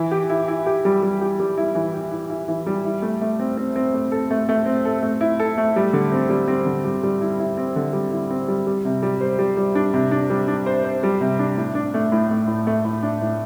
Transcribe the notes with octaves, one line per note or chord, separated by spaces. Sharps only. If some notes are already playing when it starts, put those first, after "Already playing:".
Already playing: E3
G4
E4
E4
G4
G3
G3
G4
G3
E4
E3
G4
E4
E4
E3
G3
E4
A3
A3
C4
C4
C4
A3
A4
A3
A3
C4
A4
A3
E4
A4
A3
G3
D3
C4
G3
C4
D3
G3
G3
E4
E4
C4
D3
G3
E4
C4
G3
G3
C3
G3
C5
G3
G3
D4
C3
D4
G3
D4
C5
C5
G3
C3
D4
A2
D4
A3
A2
A3
A2
A3
A2
D4
A2